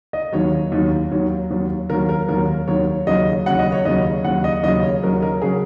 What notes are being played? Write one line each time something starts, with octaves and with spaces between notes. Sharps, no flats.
D#5
D#2 D#3 F#3 C#5
D#2 D#3 F#3
D#2 D#3 F#3
D#2 D#3 F#3
D#2 D#3 F#3 A#4
A#4
D#2 D#3 F#3 A#4
D#2 D#3 F#3 C#5
D#2 C#3 F#3 D#5
D#2 C#3 F#3 F#5
D#5
C#5
D#2 C#3 F#3 D#5
D#2 C#3 F#3 F#5
D#5
D#2 C#3 F#3 D#5
C#5
D#2 C#3 F#3 A#4
A#4
C#3 F#3 G#4